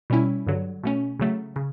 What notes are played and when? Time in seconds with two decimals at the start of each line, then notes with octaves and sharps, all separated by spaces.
0.10 B2 G3 C#4 E4
0.47 G2 D3 F#3
0.83 B2 A3 C#4
1.19 C#3 F#3 A3
1.56 C#3